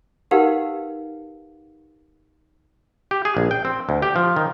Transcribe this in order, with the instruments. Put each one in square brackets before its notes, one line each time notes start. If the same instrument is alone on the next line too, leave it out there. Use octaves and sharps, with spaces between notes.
[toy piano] D#4 G4 A#4 B4 F5 F#5
[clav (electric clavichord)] G4
G#4
A#1
G5
C4
D2
G4
F3
D#3